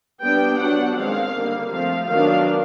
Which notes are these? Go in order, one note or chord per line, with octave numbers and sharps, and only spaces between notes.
G3 B3 D4 G5
F#3 B3 D4 F#5
D#3 G#3 C4 F5
D3 G3 A#3
F3 A3 C4 F5
D#3 F#3 B3 D4 F5